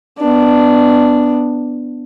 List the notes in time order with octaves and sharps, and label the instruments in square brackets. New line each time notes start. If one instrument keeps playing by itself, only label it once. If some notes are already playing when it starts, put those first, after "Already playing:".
[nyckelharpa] B3 D4